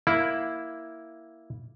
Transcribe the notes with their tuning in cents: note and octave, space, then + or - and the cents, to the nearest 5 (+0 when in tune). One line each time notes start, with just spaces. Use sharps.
A#3 +0 E4 +0 F5 +0